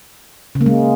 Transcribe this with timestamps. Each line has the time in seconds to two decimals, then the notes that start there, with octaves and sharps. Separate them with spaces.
0.55 C#3
0.61 A#3
0.66 G#3